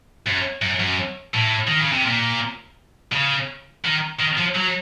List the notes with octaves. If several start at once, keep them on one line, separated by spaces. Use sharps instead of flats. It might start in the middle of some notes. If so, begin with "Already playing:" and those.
F#2
F#2
F#2
A2
D#3
C#3
C3
A#2
C#3
D#3
D#3
F3
F#3